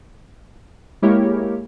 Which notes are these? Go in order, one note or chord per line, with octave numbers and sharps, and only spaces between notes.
G#3 A#3 E4 G4 A#4 C#5